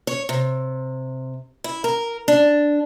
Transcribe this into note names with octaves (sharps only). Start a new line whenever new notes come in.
C#5
C3
E4
A#4
D4